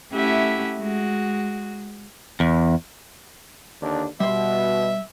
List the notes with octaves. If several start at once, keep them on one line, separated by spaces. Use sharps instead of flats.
A3 C#4 E4 G4 E5 F#5
G#3 F#4
E2
D#2 D3 D4
B2 G3 E5 C6